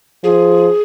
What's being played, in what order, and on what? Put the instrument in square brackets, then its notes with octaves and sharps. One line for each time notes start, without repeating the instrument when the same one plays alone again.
[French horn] F3 [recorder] G#4